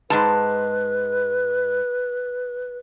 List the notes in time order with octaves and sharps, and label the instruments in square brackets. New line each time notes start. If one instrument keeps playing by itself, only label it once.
[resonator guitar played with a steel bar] G#2 G#3 A5 [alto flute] B4